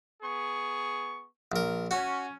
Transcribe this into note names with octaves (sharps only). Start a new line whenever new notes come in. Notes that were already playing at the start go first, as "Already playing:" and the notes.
B3 G#4 C#6
A#1 A#4
C#4 F#4